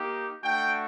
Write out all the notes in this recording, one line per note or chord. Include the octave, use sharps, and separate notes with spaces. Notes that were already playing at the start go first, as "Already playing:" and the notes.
Already playing: A#3 D#4 G4
A3 D4 F#4 G5